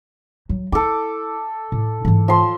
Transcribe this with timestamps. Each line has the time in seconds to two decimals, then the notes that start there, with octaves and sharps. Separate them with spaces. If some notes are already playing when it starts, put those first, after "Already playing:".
0.49 F#3
0.72 E4 A4 D6
1.72 A2
2.05 G#2 E3
2.28 F3 C6